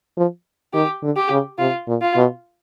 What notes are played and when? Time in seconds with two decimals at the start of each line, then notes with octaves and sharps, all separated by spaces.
0.17 F3
0.74 D#3 G4
1.03 D3
1.17 G4
1.31 C#3
1.59 C3 F4
1.87 A#2
2.02 F4
2.16 B2